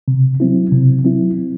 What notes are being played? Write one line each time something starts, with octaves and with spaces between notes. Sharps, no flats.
C3
F#3 C4 E4
C3
F#3 C4 E4